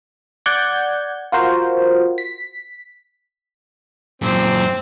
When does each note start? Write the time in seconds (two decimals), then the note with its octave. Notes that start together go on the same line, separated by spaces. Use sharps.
0.46 D5 F#5 G6 G#6
1.32 F4 F#4 A#4 C5
2.18 B6
4.22 F#2 A#2 C4